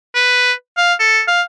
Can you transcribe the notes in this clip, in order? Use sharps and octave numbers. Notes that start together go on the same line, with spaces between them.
B4
F5
A4
F5